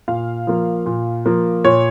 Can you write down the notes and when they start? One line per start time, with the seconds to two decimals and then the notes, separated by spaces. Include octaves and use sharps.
0.08 A#2 F5
0.47 F3 A#3
0.86 A#2
1.26 F3 A#3
1.65 A#2 C#5